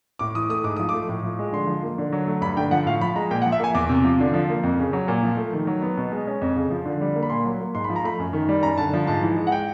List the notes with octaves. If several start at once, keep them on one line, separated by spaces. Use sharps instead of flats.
A2 D6
E3 D#6
A3 D#6
G#2 D6
F3 D#6
D6
A3
A2
F3
G#3
D3 C6
F3
A#3
D3
F#3
A3
G2 B5
D3 G5
F3 F#5
A2 F5
F3 B5
G#3 A#5
A#2 G5
F#5
F3
E5
A#3 G#5
E2 D6
C3
F3
D3
F3
A#3
F2
C#3
F#3
A#2
F3
A3
D#3
F#3
B3
B2
G#3
C#4
F2
C#3
F3
D3
G3
A#3
B5
A#2 C6
F#3
A#3
G#2 C6
B5
F3
A#5
A3 B5
F#2
D#3
G3
F#2 A#5
D3 A5
F3
G#2 A5
E3
G#3
F#5
G5